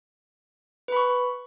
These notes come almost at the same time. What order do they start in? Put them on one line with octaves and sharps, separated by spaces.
B4 B5 C#6